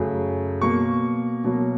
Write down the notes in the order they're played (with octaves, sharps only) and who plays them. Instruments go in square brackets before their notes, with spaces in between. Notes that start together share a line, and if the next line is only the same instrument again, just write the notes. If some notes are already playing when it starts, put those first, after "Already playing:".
Already playing: [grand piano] F#2 C#3 F#3 A3
B2 F#3 A#3 C#6
B2 F#3 A#3